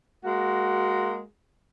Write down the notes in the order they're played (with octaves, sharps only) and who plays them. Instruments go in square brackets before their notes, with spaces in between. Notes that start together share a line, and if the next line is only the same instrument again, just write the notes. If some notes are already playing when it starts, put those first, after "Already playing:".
[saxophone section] G#3 A#3 F#4